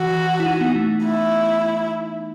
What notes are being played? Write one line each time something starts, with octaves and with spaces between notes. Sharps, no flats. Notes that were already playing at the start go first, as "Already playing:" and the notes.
Already playing: E3 F#4
E4
D#4
B3
A3
E4